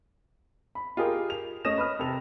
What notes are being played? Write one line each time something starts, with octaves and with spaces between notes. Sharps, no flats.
B5
F4 G4 G#4 A#4
F7
A3 C#4 D#5 D#6 A#6 E7
B4 D#6 F6
C3 A4 F7